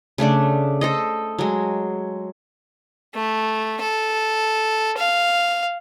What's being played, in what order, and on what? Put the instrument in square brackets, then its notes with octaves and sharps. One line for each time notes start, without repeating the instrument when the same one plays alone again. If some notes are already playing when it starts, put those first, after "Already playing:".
[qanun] C#3 A3 D4 D5
A4 C5 D#5
F#3 G#3
[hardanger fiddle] A3
A4
F5